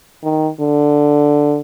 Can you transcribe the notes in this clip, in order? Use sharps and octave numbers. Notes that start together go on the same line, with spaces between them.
D#3
D3